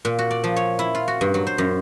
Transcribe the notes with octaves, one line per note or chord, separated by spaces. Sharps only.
A#2
F#4
D5
F3
C#5
E4
F4
F#4
G2
F#3
C5
F#2